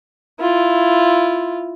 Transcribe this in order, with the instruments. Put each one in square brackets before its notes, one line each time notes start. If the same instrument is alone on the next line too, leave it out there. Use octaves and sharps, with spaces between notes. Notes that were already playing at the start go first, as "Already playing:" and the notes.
[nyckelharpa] E4 F4